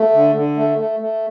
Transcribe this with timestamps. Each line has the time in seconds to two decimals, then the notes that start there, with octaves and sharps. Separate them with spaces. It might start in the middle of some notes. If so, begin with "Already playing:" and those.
Already playing: A3
0.14 D3
0.35 D3
0.57 A3
0.79 A3
1.00 A3